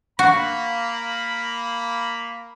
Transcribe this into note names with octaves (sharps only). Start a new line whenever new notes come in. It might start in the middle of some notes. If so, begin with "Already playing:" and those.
A#3 F#4 B5